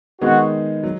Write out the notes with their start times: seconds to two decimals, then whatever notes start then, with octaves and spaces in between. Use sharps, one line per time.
0.21 D#3 G#3 B3 D#4 F#4 G#4
0.83 F#3